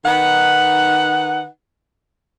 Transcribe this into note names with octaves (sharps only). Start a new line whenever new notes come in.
D#3 D#4 B4 F#5